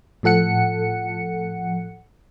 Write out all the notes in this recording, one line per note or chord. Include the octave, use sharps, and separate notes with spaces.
A2 F3 A4 F#5 C#7